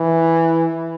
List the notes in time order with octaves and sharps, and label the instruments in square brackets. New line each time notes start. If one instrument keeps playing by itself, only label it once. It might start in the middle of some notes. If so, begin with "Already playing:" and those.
Already playing: [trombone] E3